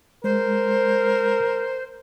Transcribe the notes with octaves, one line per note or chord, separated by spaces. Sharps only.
G#3 A#4 C5